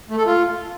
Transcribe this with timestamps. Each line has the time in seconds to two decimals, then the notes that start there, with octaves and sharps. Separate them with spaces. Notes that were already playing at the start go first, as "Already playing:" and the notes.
0.10 A3
0.18 A4
0.26 F4